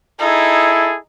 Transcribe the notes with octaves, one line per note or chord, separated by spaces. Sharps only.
D#4 E4 G#4 A4